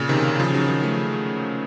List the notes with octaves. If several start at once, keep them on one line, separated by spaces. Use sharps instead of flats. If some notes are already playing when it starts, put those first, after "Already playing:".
Already playing: A#2 C#3
C3 D#3
C#3 F3
D#3 F#3
D#3 F#3
F3 A3